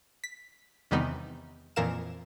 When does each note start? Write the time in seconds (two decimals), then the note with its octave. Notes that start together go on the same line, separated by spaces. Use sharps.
0.24 B6
0.91 E2 C3 D#3 G3 B3 D#4
1.76 F2 A#2 E3 A#4 F5 E7